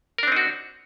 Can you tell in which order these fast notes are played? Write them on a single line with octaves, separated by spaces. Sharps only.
A#4 D4 C4 D#4 F#4